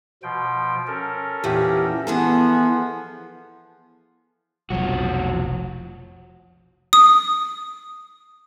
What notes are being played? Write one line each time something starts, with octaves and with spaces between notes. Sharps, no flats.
B2 F3 G5
C#4 A4 A#4
E2 A#2 G4
E3 F3 B3 G#4 A4
F1 B1 F3 F#4
D#6